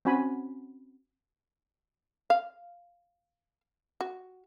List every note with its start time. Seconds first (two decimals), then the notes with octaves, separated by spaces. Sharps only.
0.05 C4 C#4 F#4 G#5 B5
2.30 F5
4.01 F#4